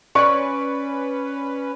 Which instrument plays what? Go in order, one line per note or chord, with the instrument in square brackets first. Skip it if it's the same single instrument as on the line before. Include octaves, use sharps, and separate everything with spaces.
[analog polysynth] C#4 B4 [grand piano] D5 C#6